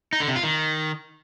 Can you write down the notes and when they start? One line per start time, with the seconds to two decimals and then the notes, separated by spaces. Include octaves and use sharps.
0.13 D#4
0.20 D3
0.28 C3
0.36 F4
0.43 D#3